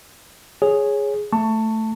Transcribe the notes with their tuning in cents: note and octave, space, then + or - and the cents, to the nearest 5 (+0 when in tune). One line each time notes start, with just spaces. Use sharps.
G#4 +0 C#5 -5
A3 +0 A5 +20 C#6 +5